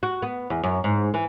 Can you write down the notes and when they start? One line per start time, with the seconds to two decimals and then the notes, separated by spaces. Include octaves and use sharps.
0.03 F#4
0.22 B3
0.50 E2
0.64 F#2
0.84 G#2
1.14 E3